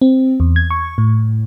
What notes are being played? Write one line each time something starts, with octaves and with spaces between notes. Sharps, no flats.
C4
E2
G#6
C#6
A2